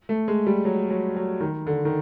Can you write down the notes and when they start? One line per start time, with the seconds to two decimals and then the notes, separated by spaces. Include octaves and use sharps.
0.09 A3
0.28 G#3
0.46 G3
0.65 F#3
0.90 F#3
1.16 F#3
1.41 D#3
1.67 D3
1.85 D#3